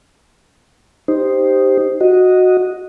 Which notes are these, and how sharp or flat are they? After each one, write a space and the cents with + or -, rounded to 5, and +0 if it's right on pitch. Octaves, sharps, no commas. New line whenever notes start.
D#4 -5 G4 +0 C5 +0
F#4 -10 D#5 +0